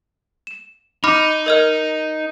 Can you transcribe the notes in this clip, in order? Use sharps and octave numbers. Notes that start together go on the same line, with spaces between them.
E7
D#4 B5 D6 F6
A#4 D#5 F6